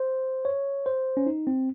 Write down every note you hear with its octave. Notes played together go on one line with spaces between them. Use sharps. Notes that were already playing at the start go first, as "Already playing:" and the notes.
Already playing: C5
C#5
C5
C#4
D#4
C4